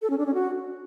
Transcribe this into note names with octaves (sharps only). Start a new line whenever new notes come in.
A4
C#4
D4
C#4
F#4